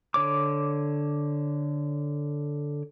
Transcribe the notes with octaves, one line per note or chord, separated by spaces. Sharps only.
D3 C#5 D6